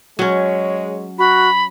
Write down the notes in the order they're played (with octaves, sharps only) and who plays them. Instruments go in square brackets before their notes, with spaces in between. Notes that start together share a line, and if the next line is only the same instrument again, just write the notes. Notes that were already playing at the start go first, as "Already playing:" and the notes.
[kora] F#3 C#4 [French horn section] G#3 C#5
[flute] F#4 [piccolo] B5